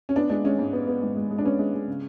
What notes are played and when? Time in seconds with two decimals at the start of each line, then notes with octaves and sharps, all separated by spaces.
0.09 C#4
0.16 B3 D4
0.30 G#3 D4
0.44 G#3 C#4
0.59 G#2
0.73 B3
0.88 B3
1.02 G#2
1.16 G#3
1.31 G#3
1.38 D4
1.44 B3 C#4
1.59 G#3
1.74 G#3
1.87 C#3